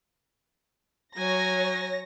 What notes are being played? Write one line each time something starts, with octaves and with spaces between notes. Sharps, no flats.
F#3 C#5 G#5 A#6